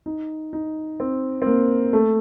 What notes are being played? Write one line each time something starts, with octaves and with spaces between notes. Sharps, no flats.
D#4
D#4
C4
C4
A#3
A3